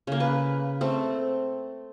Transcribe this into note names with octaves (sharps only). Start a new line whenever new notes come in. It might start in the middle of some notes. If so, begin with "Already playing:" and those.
C#3 A#3
B4
A3 C4